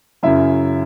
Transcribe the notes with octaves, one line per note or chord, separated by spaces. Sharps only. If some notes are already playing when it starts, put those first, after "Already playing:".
F#2 C#3 F#3 E4 E5